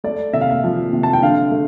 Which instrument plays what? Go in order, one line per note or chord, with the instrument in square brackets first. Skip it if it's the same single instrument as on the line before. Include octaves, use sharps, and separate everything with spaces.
[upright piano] A3 D5
C3 E5
F5
E5
F3
C3
A5
G5
D3 F5
A3